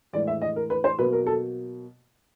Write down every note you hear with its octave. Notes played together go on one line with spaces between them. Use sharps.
A2 E3 G#3 D5
E5
D#5
A#4
B4
C5
B2 F#3 A#3 B4
A#4
A4